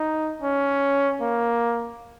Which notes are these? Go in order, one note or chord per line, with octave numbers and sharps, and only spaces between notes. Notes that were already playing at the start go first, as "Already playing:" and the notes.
Already playing: D#4
C#4
A#3